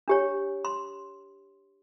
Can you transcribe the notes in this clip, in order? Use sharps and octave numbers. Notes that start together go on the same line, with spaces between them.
D4 G4 C#5
C6